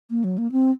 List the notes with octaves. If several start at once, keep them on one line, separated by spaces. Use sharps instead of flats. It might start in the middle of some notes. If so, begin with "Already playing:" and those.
A#3
F#3
A#3
C4